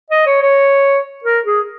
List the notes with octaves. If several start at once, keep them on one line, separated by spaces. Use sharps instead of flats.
D#5
C#5
C#5
A#4
G#4